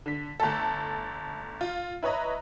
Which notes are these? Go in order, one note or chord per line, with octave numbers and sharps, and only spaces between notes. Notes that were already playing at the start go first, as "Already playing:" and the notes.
D3 B6
G1 A3 A4
F4
E4 B4 C#5 D#5 A#5